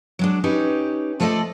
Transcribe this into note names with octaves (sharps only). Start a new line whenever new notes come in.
F#3 G#3 D4
C#4 D#4 G4 B4
F3 A3 F4 A4 D5 D#5